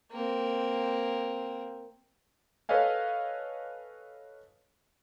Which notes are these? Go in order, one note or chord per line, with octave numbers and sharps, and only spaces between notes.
A#3 C4
A4 B4 C#5 D#5 F5 G#5